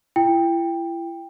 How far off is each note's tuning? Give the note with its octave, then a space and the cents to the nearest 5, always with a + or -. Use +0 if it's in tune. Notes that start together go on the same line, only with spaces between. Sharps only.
E4 +35 G5 +15